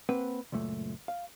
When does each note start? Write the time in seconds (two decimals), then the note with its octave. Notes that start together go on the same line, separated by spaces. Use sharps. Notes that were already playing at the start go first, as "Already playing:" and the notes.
0.09 A#3 C4 B4 F#5
0.52 C#2 F#2 A#2 A3
1.08 F5